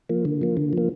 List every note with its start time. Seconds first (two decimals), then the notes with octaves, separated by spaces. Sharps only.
0.09 F3 A#3
0.25 D3
0.42 F3 A#3
0.57 D3
0.73 F3 A#3